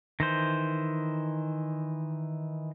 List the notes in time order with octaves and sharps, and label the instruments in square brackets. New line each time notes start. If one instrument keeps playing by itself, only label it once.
[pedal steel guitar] D#3 E3 C5